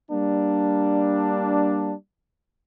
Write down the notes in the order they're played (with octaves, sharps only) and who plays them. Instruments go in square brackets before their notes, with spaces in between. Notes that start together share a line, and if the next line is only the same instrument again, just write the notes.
[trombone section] G3 A#3 D4